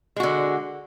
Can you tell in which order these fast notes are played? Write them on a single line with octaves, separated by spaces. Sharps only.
G#3 F#4 D3